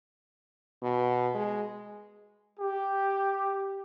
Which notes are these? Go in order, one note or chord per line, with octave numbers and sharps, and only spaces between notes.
B2
G#3
G4